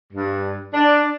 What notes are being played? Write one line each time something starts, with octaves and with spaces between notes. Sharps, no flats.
G2
D4